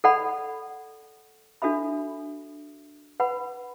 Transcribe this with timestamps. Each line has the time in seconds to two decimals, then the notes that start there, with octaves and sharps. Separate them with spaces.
0.04 A4 D5 F#5 B5
1.62 D4 F#4 A4 E5 B5
3.20 B4 F#5 B5